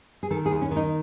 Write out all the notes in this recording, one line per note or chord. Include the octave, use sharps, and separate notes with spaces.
G#4
D#3 A4
G#4
D#2
C#4
D#3
D#4